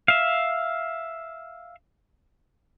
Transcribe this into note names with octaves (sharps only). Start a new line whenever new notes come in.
E5 F5